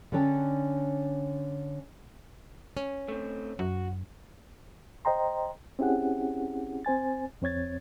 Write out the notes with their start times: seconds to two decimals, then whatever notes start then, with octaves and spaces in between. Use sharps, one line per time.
0.12 D3 C#4 D4 A4 C#5 G5
2.77 C#4
3.08 A3 C4
3.59 F#2 F#4
5.05 C5 D#5 G5 A#5 C6
5.79 C4 C#4 E4 G4 G#4 F#5
6.85 C4 C5 G#5 A6
7.42 F2 C4 C#5 G#6 A6